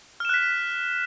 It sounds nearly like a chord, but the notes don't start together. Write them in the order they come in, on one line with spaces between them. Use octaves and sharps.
F6 E7 F#6 B6